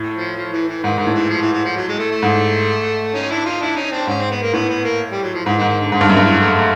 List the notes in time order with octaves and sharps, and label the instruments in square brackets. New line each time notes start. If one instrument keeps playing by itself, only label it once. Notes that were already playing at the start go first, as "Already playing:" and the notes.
Already playing: [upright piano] A2
[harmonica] F3
F3
E3
E3
[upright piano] G#2 [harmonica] D#3
[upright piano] G#2 [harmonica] D#3
[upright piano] A2
[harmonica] E3
F3
E3
E3
F3
F#3
G#3
A3
A3
[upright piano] G#2
[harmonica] C#4 D#4
D4 E4
D#4 F4
D4 E4
C#4 D#4
C4 D4
[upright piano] G#2 [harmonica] C#4
[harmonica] C4
B3
A#3
[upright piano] A2 [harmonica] B3
[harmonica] B3
A#3
G3
F#3
F3
[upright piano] G#2 [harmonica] E3
[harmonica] D#3
[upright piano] G#2
[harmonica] D#3
D3
[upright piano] G#2 [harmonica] D3
[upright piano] G2
[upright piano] F#2 [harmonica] D#3
[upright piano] G2
[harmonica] E3
A3
A3